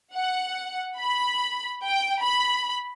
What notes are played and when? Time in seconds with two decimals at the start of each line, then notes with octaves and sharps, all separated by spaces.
0.15 F#5
0.99 B5
1.84 G5
2.22 B5